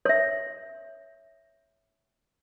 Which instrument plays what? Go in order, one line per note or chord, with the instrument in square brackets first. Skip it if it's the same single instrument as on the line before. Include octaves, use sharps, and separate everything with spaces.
[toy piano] C#5 E5